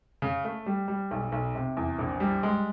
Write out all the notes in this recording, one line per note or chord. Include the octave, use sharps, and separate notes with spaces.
C#3
A3
G3
G3
B1
B1
C3
E2
A#1
G3
G#3